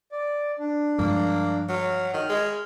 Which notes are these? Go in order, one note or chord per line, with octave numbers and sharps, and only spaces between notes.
D5
D4
G2 F3 G#3 A#3
F#3 F6
D#3 F6
G#3